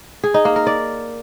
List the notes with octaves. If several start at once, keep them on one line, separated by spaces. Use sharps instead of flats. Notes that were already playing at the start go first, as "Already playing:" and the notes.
G#4
D#4
A#3
A#4
D5